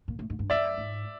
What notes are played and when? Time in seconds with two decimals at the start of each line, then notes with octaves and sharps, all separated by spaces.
0.08 A#2
0.19 A2
0.30 G#2
0.39 G2
0.50 F#2 D5 E5
0.78 G#2